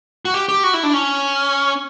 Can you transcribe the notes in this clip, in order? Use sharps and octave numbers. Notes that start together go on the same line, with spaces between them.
F#4
G4
G4
F#4
E4
D4
C#4